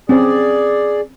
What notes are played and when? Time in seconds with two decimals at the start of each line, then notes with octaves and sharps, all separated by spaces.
0.09 C4 C#4 G#4 D5